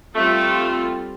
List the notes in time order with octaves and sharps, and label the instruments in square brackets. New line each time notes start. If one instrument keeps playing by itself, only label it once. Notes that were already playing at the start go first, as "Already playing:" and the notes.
[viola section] G3 C4 F4 A4 [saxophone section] A3